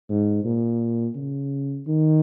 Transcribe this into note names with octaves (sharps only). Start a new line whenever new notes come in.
G#2
A#2
C#3
D#3